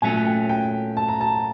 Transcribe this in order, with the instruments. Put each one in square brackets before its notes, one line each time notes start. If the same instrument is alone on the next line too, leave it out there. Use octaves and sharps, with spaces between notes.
[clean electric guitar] A#2 F#3 A3 C#4 [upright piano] G#5
[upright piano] G5
G5
A5
A#5
A5